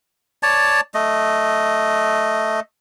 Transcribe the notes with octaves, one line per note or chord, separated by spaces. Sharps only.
C#5 D5 A5
A3 D#5